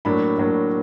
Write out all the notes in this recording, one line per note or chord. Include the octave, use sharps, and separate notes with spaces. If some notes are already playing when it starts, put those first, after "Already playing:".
A2 F#3 A#3 D4 B5
A2 F#3 A#3 D4